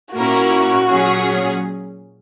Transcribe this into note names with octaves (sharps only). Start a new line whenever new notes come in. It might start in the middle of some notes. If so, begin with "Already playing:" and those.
A#2 A#3 C#4 E4 F#4 A#4
A#2 F#3 C#4 G#4 C#5